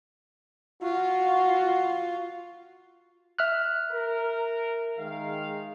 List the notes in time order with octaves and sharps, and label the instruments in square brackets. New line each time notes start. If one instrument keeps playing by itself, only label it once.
[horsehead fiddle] F4 [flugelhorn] F#4
[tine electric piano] E5 F6 F#6
[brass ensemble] A#4
D#3 G#3 F5